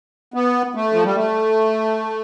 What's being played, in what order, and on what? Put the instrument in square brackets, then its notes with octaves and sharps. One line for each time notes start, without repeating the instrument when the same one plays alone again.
[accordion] B3
A3
F3
G3
A3